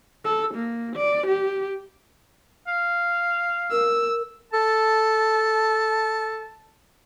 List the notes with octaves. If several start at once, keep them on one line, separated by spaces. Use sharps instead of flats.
A4
A#3
D5
G4
F5
A#4 E6
A4 A5